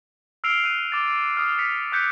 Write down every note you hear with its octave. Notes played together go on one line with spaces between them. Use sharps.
E6 F6 C7 D7 F7 G7
F#6 D#7
D6 A6
D#6 F6
B6 C#7
D6 F#6 G6 B6 C#7